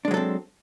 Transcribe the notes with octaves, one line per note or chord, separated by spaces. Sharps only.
F#3 G#3 C4 D4 A4